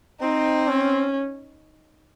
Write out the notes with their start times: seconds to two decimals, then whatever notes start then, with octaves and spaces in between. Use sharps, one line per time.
0.21 C4 D#4
0.68 C#4